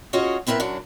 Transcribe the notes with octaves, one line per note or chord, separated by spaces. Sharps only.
C#4 F4 F#4 G#4 C#5 D#5
B3 C4 E4 A#4 B4
F#2 F#3 D4